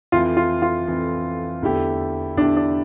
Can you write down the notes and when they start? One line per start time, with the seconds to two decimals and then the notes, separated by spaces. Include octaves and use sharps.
0.12 F2 E3 A3 F4
0.37 F4
0.62 F4
0.87 F2 E3 A3
1.62 E2 D3 A3 E4 G4
2.37 E2 D3 A3 D4 E4 G4
2.56 D4